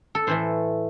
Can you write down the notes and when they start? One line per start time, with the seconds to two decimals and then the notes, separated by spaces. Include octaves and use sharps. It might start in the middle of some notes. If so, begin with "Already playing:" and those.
0.15 A4
0.27 A2 E3 A3 C5